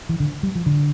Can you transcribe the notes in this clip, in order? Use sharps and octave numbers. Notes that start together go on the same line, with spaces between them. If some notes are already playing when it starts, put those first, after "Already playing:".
E3
D3
G3
F3
D3